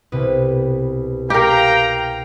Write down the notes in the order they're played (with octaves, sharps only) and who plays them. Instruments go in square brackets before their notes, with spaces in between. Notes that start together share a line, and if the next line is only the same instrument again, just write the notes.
[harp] C2 B2 B4
[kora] G4 A#4 [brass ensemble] F5 G5 A#5